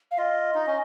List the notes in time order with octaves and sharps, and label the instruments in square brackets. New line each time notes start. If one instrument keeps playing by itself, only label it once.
[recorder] F5
[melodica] F4 [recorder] D#5
[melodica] D#4
C#4